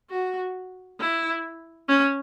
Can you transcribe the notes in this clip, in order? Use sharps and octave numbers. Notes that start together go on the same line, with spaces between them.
F#4
E4
C#4